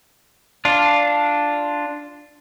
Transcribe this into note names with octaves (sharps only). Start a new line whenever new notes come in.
D4 F4